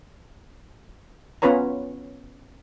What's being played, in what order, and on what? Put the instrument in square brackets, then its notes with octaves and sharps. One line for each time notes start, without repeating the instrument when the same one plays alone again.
[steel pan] B3 C#4 F4 B4 C#5 A#5